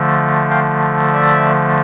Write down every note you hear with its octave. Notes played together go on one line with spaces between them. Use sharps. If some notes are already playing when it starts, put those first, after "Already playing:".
Already playing: D3 F3 A3
F5 G5
D5 E5